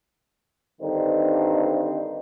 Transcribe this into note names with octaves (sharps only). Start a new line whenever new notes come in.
G2 D3 D#3 C4 D#4